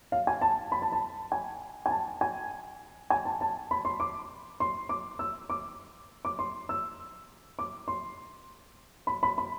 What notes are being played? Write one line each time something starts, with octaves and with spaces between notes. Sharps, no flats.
F5
G#5
A5
B5
A5
A5
G#5
G#5
A5
G#5
G#5
A5
A5
B5
C6
D6
C6
D6
E6
D6
D6
C6
E6
D6
C6
B5
B5
B5